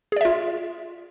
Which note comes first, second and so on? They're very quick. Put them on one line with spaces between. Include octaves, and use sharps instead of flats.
G#4 D5 E5 F4